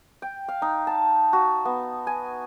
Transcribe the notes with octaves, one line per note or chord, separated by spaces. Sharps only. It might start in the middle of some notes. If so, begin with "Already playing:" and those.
G5
F5
D#4
A5
F#4
B3
G#5